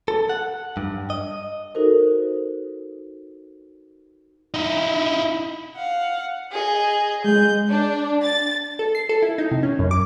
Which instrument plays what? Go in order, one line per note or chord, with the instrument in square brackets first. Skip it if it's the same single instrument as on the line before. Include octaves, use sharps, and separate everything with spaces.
[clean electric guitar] A4
F#5
G2
D#5
[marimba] D#4 F#4 A4 A#4 C5
[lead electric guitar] D#4 E4
[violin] F5 F#5
G#4 D#5
[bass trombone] G#3 [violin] G6
[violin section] D4
A6
[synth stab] A4
C7
A4
E4
D#4
C3
C#4
F#2
D6